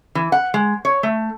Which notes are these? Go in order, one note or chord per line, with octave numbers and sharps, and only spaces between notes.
E3
F#5
G#3
C#5
A3